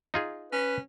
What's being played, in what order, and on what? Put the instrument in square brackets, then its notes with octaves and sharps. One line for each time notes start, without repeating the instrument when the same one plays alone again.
[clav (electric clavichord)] D#4 F4 G#4
[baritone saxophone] C#4 [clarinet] B4